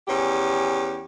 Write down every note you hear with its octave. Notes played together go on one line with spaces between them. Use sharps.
E2 C#4 G4